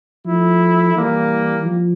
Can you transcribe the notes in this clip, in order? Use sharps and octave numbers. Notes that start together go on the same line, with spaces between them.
F3 A3 E4
E3 G3 A#3
F3